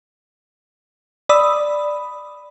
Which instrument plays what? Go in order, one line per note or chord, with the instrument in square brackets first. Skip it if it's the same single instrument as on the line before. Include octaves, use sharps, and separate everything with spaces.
[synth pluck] D5 B5 D#6 E6